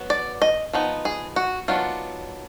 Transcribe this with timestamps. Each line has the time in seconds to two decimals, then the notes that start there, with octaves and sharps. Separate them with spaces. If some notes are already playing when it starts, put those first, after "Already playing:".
Already playing: F#3 B3
0.10 D5
0.42 D#5
0.73 F3 B3 D#4
1.05 G#4
1.36 F#4
1.68 D#3 F#3 B3 D4 F4